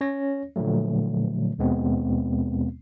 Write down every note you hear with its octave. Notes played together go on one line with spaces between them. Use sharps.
C#4 C#5 A#6
A#2 D3 F3 F#3 A3
D#2 B2 G#3 B3 C4